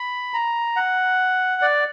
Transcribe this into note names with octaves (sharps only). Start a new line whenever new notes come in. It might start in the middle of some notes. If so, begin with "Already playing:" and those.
Already playing: B5
A#5
F#5
D5